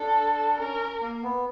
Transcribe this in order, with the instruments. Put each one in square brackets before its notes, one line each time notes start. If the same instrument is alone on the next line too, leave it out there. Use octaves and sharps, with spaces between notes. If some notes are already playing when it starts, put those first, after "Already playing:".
Already playing: [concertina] D4 [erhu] A4
[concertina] C#4 [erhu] A#4
[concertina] A#3
B3